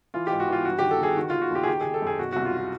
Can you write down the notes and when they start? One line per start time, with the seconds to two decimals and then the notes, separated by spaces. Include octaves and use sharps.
0.14 E3 F4
0.27 G#2 G4
0.40 F#4
0.48 E3 F4
0.65 G2 F#4
0.79 D#3 G4
0.91 A4
0.99 D#3 G#4
1.17 D#3 F#4
1.30 D#3 F4
1.42 F#4
1.51 D#2 G4
1.63 G#4
1.67 D#3 G4
1.81 D#3 G#4
1.94 A4
2.02 F#2 G#4
2.19 B2 F#4
2.32 C2 F#4
2.45 F4
2.57 F4